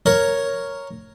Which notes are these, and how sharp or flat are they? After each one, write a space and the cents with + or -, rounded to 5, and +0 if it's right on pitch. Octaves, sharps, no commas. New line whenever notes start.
A#4 +0 C#5 +0